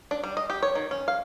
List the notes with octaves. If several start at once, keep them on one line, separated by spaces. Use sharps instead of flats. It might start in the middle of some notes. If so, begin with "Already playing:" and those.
D4
G3
D#5
G4
C#5
D#3
C#4
F5